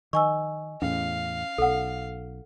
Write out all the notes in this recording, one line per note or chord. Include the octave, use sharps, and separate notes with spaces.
D#3 D#5 G#5 C#6 E6
E2 A2 C#4 F5
B1 A4 F#5